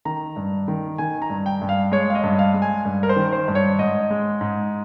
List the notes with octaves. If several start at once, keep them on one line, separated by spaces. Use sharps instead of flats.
D#3 A#5
G2
D#3
D#3 G#5
A#5
G2
G5
G2
F5
G#3 C#5
F5
D#5
G2
F5
G#3
G#5
G2
A#4
C5
D#3
C5
G2
C#5
G#2 D#5
G#3
G#2